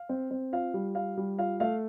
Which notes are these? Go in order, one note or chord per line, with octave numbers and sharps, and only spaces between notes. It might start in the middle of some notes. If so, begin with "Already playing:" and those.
Already playing: F5
C4
C4
F4 F5
G3
F4 F5
G3
F4 F5
A3 F5